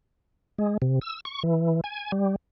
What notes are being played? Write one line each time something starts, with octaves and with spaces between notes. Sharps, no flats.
G#3
C3
E6
C#6
E3
G#5
G3